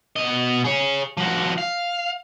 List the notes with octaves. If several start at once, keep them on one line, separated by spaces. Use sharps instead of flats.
B2 D#5
G#4 C#5
F3 F#4
F5